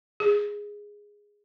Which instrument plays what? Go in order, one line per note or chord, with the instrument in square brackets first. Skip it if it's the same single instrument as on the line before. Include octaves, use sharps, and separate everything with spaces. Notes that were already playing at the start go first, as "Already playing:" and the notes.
[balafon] G#4